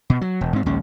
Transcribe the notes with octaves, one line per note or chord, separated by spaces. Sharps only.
B2
F#3
E1
G#2 C4
A#1 D#2 G#3 C#4